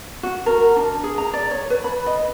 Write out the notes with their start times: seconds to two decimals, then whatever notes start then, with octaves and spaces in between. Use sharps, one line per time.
0.23 F#4
0.46 A#4
0.76 D4
1.04 G#4
1.18 A#5
1.33 D5
1.51 C#5
1.70 B4
1.84 B5
2.06 D#5